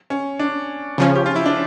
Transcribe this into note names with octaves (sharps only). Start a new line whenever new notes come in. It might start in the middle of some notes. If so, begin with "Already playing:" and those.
C#4
D4
C#3 F3 C#4
G4
F4
E4
D4